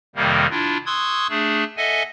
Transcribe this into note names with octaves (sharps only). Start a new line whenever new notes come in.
F2 C3 D#3 G3 A#3
D4 E4 F4
C6 C#6 D#6 E6 F#6 G#6
A3 D4 G#4
A4 D#5 E5 F#5 G#5